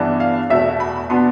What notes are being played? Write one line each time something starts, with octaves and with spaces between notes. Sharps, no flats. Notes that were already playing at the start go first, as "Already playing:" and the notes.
Already playing: G2 E3 B3 D4
F5
E2 B2 A3 E5
B5
B2 B3 D4 C6